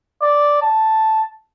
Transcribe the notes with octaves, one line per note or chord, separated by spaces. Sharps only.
D5
A5